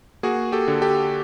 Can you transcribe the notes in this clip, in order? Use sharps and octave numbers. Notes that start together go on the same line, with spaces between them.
A#3 F#4 G#4
G4 A4
D3
G4 A4